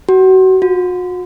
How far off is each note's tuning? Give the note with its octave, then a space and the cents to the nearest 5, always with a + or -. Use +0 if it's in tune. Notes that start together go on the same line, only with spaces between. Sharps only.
F#4 +30
F#4 -40